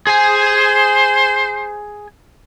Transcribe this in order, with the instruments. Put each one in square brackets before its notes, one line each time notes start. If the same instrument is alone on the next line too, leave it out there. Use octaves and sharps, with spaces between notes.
[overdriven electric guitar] G#4 G#5 [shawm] C5